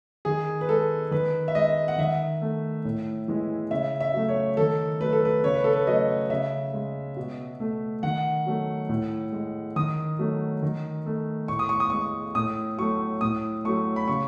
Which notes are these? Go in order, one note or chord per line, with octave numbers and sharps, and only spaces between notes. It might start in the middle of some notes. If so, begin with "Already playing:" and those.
D#3 G#4
B4
G#3 A4
D#3 B4
E5
G#3 D#5
F#5
D#3 E5
A3
A2
E3 G#3
C#3 E5
E5
F#3 A3
C#5
D#3 A4
F#3 A3 B4
A4
B4
C#3 C#5
B4
A4
B4
F#3 A3 D#5
C#3 E5
G#3
B2
A3
D#3 F#5
F#3 A3
A2
G#3
D#3 D#6
F#3 A3
D#3
A3
A2 C#6
D#6
C#6
D#6
G#3 C#6
A2 D#6
F#3 A3 C#6
A2 D#6
F#3 A3 C#6
B5
C#3 C#6